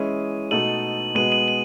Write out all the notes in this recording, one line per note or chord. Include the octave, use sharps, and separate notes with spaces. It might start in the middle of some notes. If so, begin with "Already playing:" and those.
Already playing: E3 G#3 C#4 E4 G#4 D#7
B2 A3 D#4 A4 D#7 F#7
B2 G#3 B3 D#7 F#7
D#7 F#7
D#7 F#7